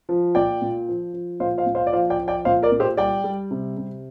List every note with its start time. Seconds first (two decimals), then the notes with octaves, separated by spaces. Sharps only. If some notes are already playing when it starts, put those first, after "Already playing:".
0.09 F3
0.35 A#2 D5 G5
0.62 A#2
0.88 F3
1.14 F3
1.40 A#2 C5 F5
1.58 C5 F5
1.66 A#2
1.75 C5 F5
1.87 D5
1.92 F3 C5 F5
2.10 D5 G5
2.20 F3
2.28 D5 G5
2.45 A#2 C5 F5
2.63 A#4 D5
2.72 A#2
2.80 G4 C5
2.97 G3 D5 G5
3.24 G3
3.51 C3
3.77 C3